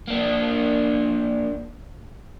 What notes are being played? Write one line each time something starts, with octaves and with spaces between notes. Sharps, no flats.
A#3 D4